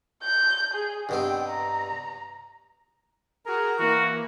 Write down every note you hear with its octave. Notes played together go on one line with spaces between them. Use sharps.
G6
G#4
G2 B2 C4 G5
A#5
F#4 G#4 A#4 A#5
E3 A#3 F#4